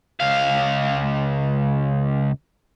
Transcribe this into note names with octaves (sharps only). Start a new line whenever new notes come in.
C#2 F5